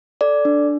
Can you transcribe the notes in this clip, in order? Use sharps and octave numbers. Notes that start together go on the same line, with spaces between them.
A4 D5
D4